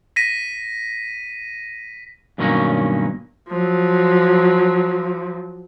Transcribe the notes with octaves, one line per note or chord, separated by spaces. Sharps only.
A#6 B6 D#7
G2 B2 D#3 F#3 A#3 C#4
F3 F#3